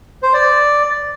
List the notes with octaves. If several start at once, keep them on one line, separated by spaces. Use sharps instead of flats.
C5
D5